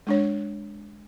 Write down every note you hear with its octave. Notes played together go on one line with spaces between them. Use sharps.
G#3 D4 C#5